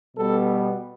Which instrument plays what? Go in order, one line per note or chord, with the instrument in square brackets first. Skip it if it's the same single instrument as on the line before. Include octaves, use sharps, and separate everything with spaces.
[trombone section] B2 G3 B3 A4